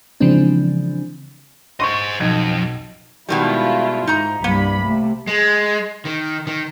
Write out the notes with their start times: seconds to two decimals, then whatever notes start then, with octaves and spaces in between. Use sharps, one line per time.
0.20 C#3 E3 F3 G#3 C4 D4
1.80 C5 D#5 C6 C#6
2.20 B1 F2 D#5 G#6
3.29 B2 D#3 G3 G#3 E4 F4
4.07 G#2 D#4 A#5
4.44 C2 G2 A#3 B5
4.84 C3 A3
5.27 G#3
6.05 D#3
6.47 D#3